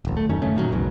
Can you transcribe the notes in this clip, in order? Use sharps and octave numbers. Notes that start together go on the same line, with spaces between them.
D1 A1
A3
F#2 D#3 C#4
G1 C#3 A3 C#4
A#2 D#3 F3 F#3
B1 E2 G#2 B2